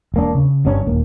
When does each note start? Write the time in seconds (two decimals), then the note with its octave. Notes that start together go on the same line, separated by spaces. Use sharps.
0.14 E1 A#3 D4
0.35 C#3
0.65 G1 G2 C#4 D4
0.87 D#1 A#3